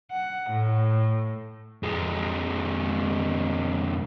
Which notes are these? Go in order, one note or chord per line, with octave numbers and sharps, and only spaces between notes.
F#5
A2
F2 G#3